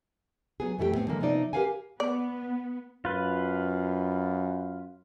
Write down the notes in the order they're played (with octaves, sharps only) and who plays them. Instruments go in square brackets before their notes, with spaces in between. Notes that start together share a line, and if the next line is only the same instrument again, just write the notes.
[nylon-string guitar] F#3 B3 G#4
F2 E3 A3 F#4 G4 G5
A2 B3 C4
D3 E3 F#3 G#3 A#3
C3 F3 B3 D#4 D5
G4 A#4 B4 F5 F#5 G#5
[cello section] B3 [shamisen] D5
[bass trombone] F#2 [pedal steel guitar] F4 B4